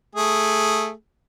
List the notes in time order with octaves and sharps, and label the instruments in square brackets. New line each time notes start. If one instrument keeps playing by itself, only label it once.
[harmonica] A3 G#4